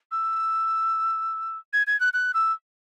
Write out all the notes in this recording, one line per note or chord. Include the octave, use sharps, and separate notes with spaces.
E6
G#6
G#6
F#6
F#6
E6